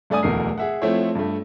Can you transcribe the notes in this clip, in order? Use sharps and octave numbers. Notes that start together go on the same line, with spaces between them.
G2 A3 D5 G#5 D#6
D1 E2 B2 A3 A#4 C7
G#4 E5 F#5
F3 A3 C4 E4 C#5
G2 A3